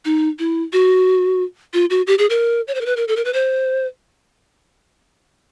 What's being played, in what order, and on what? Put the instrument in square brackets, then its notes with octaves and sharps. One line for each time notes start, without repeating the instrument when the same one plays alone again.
[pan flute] D#4
E4
F#4
F4
F#4
G4
G#4
A#4
C#5
C5
A#4
B4
A#4
A4
A#4
B4
C5